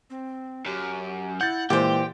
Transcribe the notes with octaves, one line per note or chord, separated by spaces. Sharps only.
C4
F#2 G4
E4 F#5 G6 A6
A#2 E3 G#3 G4 C5 G5